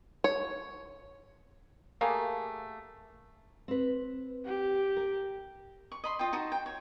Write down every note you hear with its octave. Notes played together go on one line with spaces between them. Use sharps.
C#5
A3 A#3 G4 G#4
C4 B4
G4
A#4
C#6
D#5 B5 C6
F4 D#5 G5
D#4 F#4 A5
G5
C#5